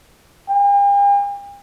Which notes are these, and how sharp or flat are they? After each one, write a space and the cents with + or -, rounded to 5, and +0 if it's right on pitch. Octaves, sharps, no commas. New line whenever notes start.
G5 +45